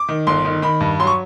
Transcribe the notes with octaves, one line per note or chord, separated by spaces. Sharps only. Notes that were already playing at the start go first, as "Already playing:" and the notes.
Already playing: D6
D#3
G1 C6
D#3
D#3 B5
G2
F#3 C6
C#6